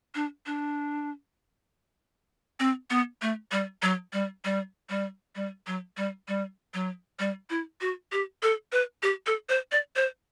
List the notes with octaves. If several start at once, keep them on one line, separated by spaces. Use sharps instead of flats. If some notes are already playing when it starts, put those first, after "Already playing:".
D4
D4
C4
B3
A3
G3
F#3
G3
G3
G3
G3
F#3
G3
G3
F#3
G3
E4
F#4
G4
A4
B4
G4
A4
C5
D5
C5